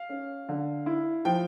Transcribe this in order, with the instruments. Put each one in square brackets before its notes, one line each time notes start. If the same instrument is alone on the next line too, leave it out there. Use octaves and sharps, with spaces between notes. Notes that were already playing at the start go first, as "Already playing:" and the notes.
Already playing: [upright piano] F5
[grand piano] C#4
D3
E4
[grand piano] F3 [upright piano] G5